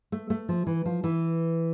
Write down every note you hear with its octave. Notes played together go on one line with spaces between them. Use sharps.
A3
A3
F3
E3
F3
E3